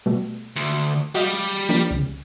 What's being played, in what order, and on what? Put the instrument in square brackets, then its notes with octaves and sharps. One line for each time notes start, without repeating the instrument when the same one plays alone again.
[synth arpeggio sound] B2 G3 A3
[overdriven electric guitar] D2
[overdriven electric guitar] G3 G4 [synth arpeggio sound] F#4 D#5 F5
[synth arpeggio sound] F3 A#3 D4
C#2 C#3